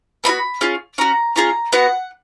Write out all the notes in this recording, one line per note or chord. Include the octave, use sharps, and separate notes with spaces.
B3 D#4 B5
F#4
C#4 F4 G#4
C#4 F#4 A#5
C#4 F4 G#4 A#5
B3 F#4 F#5